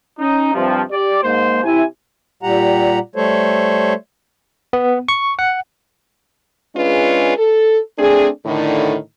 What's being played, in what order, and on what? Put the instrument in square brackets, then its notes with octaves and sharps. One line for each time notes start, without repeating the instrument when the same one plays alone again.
[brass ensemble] C#4 D#4
G2 C3 F3
G4 D5
G#2 A#3 C5
C3 E4 G#5
[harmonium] A#2 G3 G4 F#5 A#5
G3 A3 A4 C5 C#5
[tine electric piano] B3
C#6
F#5
[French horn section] G#3 C#4 D4 F4 G#4 B4
A4
A3 C4 D4 G#4
A2 D3 D#3